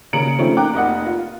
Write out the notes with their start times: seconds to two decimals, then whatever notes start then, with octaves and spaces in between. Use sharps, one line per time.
0.13 C#3 A#3 A#5 C#7 D7 F#7
0.39 F3 A3 C4 C#4 D#4
0.57 A#3 D#4 G5 A#5 D6 F#6
0.73 F1 A#3 D#5 F#5
1.06 F4